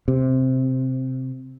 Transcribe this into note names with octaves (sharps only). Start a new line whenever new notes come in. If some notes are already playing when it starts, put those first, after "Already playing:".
C3